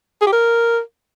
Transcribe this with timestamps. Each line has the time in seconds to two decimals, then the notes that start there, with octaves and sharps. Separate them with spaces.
0.21 G#4
0.27 G4
0.33 A#4